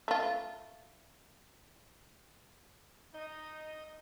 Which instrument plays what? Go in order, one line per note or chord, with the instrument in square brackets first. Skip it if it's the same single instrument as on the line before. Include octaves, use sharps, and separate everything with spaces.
[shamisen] A3 F4
[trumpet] D#4 [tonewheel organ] D#5